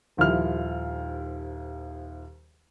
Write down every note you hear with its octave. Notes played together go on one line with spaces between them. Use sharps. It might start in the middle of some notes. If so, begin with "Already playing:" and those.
D#1 D#2 F3 E4 F6